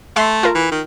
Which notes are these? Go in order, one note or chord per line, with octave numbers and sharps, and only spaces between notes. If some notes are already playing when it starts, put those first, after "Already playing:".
A3 E5 C6
F4 A#4
E3
D#3